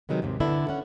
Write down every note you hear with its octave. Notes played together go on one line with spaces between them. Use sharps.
C3 D#3 F#3 G#3 B3
D#2 G#2 C3
D3 B3 D4 E4
C#4 F#5